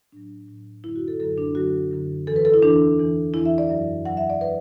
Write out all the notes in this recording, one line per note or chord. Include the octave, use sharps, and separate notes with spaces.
A2 F#3 D4
A2 F#3
F#2 D3 F#3 E4
F#4
A4
F#2 D3 F#3 A4
D4
F#2 D3 F#3 F#4
F#2 D3 F#3
E2 E3 A4
B4
A4
E4
E2 E3 D4
E2 E3
E2 E3 E4
E5
D5
F#2 F#3
F#2 F#3 F#5
E5
D5
F#3 B4